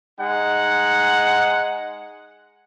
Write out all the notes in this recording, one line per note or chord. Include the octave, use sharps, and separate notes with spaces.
G#3 D#4 F#5